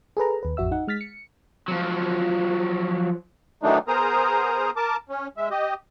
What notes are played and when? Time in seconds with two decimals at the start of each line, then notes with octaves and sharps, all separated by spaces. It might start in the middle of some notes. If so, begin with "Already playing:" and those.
0.17 G#4 A4 B4 A#5
0.43 D#2 B4
0.57 A1 F2 F#4 E5 E6
0.72 D#4 F#5
0.88 G#3 F6 A6 B6
1.01 C#7
1.68 F3 F#3
3.62 D#3 E3 F#3 A3 D4 D#4
3.88 B3 G#4 A#4 C5 A#5 D#6
4.76 A#4 A5 D6
5.09 C#4
5.37 G#3 E5
5.51 G4 D#5